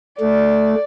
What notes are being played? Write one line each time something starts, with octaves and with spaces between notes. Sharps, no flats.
A3 D5